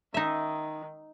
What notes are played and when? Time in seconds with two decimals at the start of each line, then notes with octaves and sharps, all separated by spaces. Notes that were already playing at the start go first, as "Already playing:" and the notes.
0.14 D#3 D#4 E5